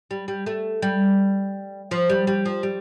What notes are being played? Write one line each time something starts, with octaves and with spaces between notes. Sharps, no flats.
G3
G3
A3
G3
F3
G3
G3
F3
G3